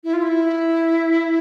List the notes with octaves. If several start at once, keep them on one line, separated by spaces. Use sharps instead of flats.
E4
F4
E4